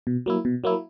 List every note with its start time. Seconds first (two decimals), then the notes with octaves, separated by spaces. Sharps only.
0.07 B2
0.26 F#3 A#3 E4
0.45 B2
0.64 F#3 A#3 E4